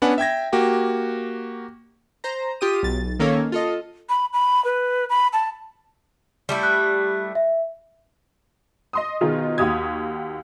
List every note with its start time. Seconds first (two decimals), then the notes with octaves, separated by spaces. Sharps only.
0.02 B3 C#4 D4 B4 F#5 G#5
0.18 E5 G5 G#6 A#6
0.52 A#3 F#4 G4 G5
2.24 C5 A#5
2.61 F4 G4 D#6 D#7
2.83 B1 A6
3.19 D#3 A#3 C#4 A4 C#5
3.52 F4 A4 D#5
4.09 B5
4.33 B5
4.65 B4
5.10 B5
5.33 A5
6.49 G3 A3 E4
6.63 F#6
7.35 E5
8.93 D#5 C6 D#6
9.21 B2 D#3 D#4 F4 G#4
9.58 D#2 F#4 G4 D#6 G#6